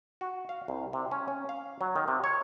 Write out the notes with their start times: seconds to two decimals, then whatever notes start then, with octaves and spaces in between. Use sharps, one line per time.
0.21 F#4
0.49 F5
0.68 C2
0.93 C3
1.11 C#4
1.28 C#4
1.49 F5
1.81 F#3
1.96 D#3
2.08 C3
2.24 C#5